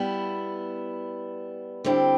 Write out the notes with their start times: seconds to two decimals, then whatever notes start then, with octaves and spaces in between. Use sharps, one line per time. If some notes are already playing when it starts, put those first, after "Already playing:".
Already playing: G3 B3 E4
1.84 D3 G3 C4 E4 G4